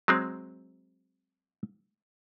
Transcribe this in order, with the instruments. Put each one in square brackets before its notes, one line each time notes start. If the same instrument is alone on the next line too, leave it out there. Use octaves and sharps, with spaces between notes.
[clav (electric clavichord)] F#3 G#3 C4